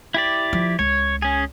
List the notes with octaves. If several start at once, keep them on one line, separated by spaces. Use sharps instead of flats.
E4 G4 D5
F3
C#2 C#5
C#4 G#4